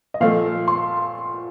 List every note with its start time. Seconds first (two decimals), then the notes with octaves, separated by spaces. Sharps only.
0.14 D#5
0.20 A#2 F3 A3 F5
0.68 C6